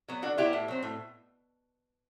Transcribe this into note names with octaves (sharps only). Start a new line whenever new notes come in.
F#3 B3
D3 D4 F#4
F#3 B3 E4 G4
A2
F#3 C4
A2